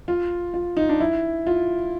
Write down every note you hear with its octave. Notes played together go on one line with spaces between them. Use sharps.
F4
F4
D#4
D4
E4
F4